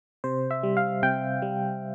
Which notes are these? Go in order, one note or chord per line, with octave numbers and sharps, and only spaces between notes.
C3 C5
E5
G3
F5
C3 G5
G3